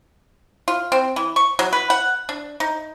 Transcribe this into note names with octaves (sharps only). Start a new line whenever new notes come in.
F4
C4
E3
C#6
F#3
B4
F#5
D4
D#4